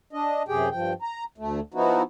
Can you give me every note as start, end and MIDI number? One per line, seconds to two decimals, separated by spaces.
0.13 0.43 62
0.13 0.43 75
0.48 0.69 42
0.48 0.69 48
0.48 0.69 67
0.48 0.69 68
0.48 0.69 79
0.71 0.93 43
0.71 0.93 53
0.71 0.93 79
1.02 1.24 82
1.38 1.60 38
1.38 1.60 57
1.74 2.02 53
1.74 2.02 59
1.74 2.02 63
1.74 2.02 64
1.74 2.02 66